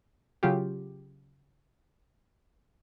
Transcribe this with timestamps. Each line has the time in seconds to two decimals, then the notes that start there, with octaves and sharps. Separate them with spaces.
0.43 C#3 F#3 F4 G4